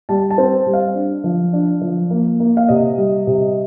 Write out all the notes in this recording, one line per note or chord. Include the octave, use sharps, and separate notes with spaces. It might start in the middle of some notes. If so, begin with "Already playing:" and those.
G3 A5
A5
C4
G3
F5
D4
F3
D4
F3
A#3
A#3
F5
C3 D#5
G3
C3